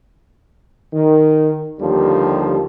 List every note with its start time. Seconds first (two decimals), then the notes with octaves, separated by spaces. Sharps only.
0.94 D#3
1.80 D#2 D3 F3 G3